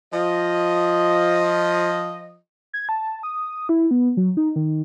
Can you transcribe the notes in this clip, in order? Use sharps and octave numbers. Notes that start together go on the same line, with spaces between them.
F3 D#5
G#6
A5
D#6
E4
B3
F#3
D#4
D#3